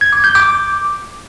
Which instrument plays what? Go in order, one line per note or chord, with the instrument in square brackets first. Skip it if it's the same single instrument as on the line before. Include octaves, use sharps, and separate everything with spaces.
[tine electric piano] G#6
D6
G6
D6